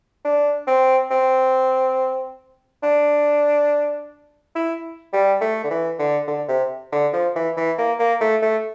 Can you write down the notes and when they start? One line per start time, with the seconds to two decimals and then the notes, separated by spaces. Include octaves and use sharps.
0.25 D4
0.67 C4
1.11 C4
2.83 D4
4.55 E4
5.13 G3
5.41 A3
5.64 D3
5.70 E3
5.99 D3
6.27 D3
6.48 C3
6.92 D3
7.13 F3
7.35 E3
7.57 E3
7.78 A#3
7.99 A#3
8.21 A3
8.42 A3